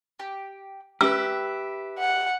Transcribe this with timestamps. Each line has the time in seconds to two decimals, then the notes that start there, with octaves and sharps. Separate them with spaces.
0.19 G4
1.01 G4 B4 E5 E6
1.99 F#5